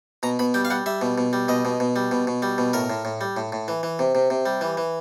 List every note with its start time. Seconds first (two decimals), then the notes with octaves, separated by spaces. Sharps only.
0.23 B2 A#5
0.39 B2 B5
0.54 G3 G5
0.65 F5
0.70 G3 F#5
0.86 G3 E5
1.01 B2
1.18 B2
1.33 G3
1.48 B2 D#5
1.65 B2
1.80 B2
1.96 G3
2.11 B2
2.27 B2
2.42 G3
2.58 B2
2.73 A2 A#4
2.90 A2
3.05 A2
3.21 G3
3.37 A2
3.52 A2
3.68 E3
3.83 E3
3.99 C3
4.15 C3
4.30 C3
4.46 G3
4.61 E3
4.77 E3